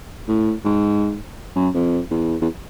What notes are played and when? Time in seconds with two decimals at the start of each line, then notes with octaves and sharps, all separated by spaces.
0.28 A2
0.65 G#2
1.56 F#2
1.74 F2
2.11 E2
2.41 E2